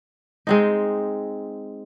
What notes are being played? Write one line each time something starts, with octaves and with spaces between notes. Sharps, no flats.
G#3 C4 D#4